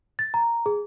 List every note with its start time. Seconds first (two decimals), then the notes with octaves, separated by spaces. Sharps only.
0.19 A6
0.34 A#5
0.66 G#4